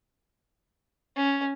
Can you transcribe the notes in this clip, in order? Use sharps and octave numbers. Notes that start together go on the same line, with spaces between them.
C#4